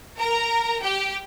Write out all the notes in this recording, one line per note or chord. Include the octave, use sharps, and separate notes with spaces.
A#4 A#5
G4 G5